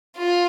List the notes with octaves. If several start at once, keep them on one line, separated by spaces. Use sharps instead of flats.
F4